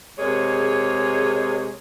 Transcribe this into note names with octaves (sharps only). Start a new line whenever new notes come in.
C3 G#3 A#3 G#4 C#5